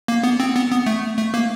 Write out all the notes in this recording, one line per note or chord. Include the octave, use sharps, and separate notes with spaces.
A#3
B3
C4
B3
B3
A3
A3
A#3